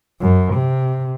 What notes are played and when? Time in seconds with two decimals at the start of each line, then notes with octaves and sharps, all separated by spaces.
0.21 F#2
0.54 C3